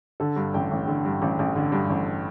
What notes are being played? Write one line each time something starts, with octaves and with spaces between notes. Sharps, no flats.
D3 A4
G2
A1 G5
A1
D3
G2
A1
A1
D3
G2
A1